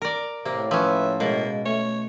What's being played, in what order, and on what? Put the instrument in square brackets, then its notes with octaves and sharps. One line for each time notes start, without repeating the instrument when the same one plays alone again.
[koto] A#4 D5
[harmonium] A2 [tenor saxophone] C3 [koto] A#3
[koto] F3 C#4 [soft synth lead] B4 [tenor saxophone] E5
[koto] B2 [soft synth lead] G#3 [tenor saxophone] A#3
[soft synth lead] A3 [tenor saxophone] C#5